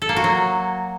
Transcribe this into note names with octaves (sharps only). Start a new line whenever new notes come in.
A4
A#3
F#4
F#3